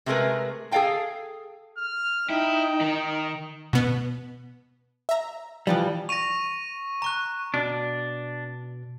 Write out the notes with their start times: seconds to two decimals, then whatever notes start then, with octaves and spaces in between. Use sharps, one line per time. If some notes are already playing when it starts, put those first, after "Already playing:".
0.06 C3 G#3 A3 G#4 A#4 B4
0.71 G#4 A4 D5 F5 G5 A5
1.78 F6
2.30 D#4 E4 G5
2.81 D#3
3.73 B2 B3
5.09 E5 A#5
5.67 E3 F3 G3
6.09 C#6 A#6 D#7 F7
7.02 A#5 C#6 F#6
7.54 B2 D4